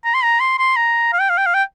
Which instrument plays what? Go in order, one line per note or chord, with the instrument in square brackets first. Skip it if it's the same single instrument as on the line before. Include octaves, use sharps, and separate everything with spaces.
[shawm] A#5
C6
A#5
C6
C6
A#5
F5
G5
F5
G5
F5
G5